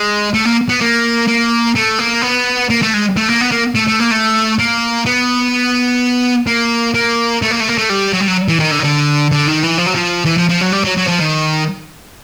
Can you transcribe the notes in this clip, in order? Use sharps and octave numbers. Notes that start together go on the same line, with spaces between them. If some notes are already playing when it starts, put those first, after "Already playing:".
Already playing: G#3
A3
A#3
B3
A#3
A#3
A3
A#3
B3
A#3
A3
G#3
A3
A#3
B3
A#3
A3
A3
A#3
A3
A#3
B3
A#3
A#3
A3
A#3
A3
A#3
A3
G3
F#3
G3
F#3
E3
D#3
D3
D#3
D3
D3
D#3
E3
F3
F#3
F3
E3
F3
F3
F#3
G3
F#3
F#3
F3
D#3